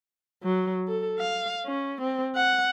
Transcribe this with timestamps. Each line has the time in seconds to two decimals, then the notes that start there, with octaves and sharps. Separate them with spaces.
0.43 F#3
0.88 A4
1.19 F5
1.66 C#4
2.01 C4
2.36 F#5